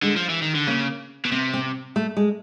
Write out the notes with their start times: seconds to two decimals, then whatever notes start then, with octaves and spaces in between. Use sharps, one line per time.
0.03 D3 G#3
0.17 F3
0.30 E3
0.42 D#3
0.55 D3
0.67 C#3 A#3
1.25 B2
1.32 C3 B3
1.54 C4
1.96 A3
2.17 G#3